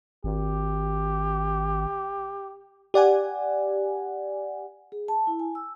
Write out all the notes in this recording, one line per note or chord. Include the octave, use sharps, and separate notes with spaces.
G#1 G4
G4 D5 F#5 G#5
G#4
A5
E4
G#5
E6